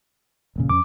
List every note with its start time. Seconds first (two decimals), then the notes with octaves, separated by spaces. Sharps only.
0.56 E1 A#2 C#3
0.69 F2 C#4 D6